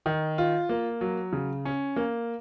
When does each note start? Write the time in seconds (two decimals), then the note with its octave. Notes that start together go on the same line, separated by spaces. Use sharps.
0.06 D#3
0.38 F4
0.69 A#3
1.01 F#3
1.33 C#3
1.65 C#4
1.96 A#3